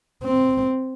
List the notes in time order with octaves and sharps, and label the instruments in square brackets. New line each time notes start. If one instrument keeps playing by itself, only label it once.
[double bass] C4